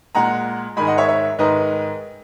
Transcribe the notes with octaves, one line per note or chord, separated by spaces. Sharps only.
A#2 G#3 F#5 A#5
G#2 D#3 G#3 G#5 B5
D#5 F#5
C#5 E5
C#5 E5
G#2 D#3 G#3 B4 D#5